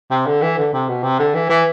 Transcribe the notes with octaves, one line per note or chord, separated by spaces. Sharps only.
C3
D3
E3
D3
C3
B2
C3
D3
E3
E3